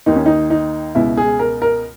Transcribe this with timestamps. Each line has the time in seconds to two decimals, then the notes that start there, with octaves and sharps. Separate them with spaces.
0.06 D#2 D#3 D#4
0.16 C#4
0.26 D#4
0.50 D#4
0.95 C#2 B2 E4
1.17 G#4
1.39 A#4
1.62 A#4